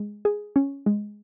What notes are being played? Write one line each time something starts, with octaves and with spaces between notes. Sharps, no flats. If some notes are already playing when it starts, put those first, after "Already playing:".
Already playing: G#3
G#4
C#4
G#3